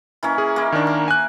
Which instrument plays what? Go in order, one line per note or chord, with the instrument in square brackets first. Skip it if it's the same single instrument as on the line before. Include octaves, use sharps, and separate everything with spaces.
[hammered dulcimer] E3 A#3 C#4
[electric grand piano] G#4
[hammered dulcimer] A#3 E4
[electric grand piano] D#3 D4
[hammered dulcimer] A#4
[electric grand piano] G#5 F#6